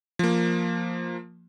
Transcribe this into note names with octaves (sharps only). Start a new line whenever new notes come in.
F3 A#3